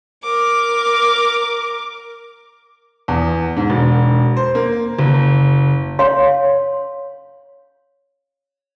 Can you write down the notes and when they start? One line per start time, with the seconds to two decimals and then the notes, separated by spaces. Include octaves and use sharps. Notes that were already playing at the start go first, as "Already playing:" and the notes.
0.23 A#4 D6
3.08 E2
3.57 G#2
3.70 E1
4.37 C5
4.55 A#3
4.99 F#1
5.99 C#5 F5 C6